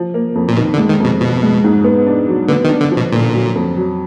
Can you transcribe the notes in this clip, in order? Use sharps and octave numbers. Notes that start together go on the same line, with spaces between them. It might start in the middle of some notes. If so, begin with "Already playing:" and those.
Already playing: F3
A#3
F2
A#2
B2 D#3
D3
G#3
D#3
F2 B2
B2 F3
G#3
G#2
B3
D4
F#3
D3 B3
D#3
D4
D3
F3
B2
A#2 D3
F#3
F2
F#3